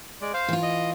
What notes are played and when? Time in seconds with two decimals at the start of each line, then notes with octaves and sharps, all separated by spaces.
0.21 G#3 D5
0.34 C5 F5
0.48 E3 F4
0.63 D#5